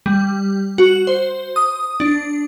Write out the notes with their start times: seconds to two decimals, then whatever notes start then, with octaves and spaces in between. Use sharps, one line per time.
0.06 G3
0.78 F#4
1.07 C5
1.56 D#6
2.00 D4